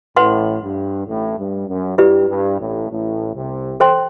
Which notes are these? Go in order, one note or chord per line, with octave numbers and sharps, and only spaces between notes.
A1 A2 B4 F#5 C6
G2
A1 A2
G2
F#2
G2 E4 G4 B4 D5
G2
A1 A2
A1 A2
C2 C3
A4 C5 G5 C6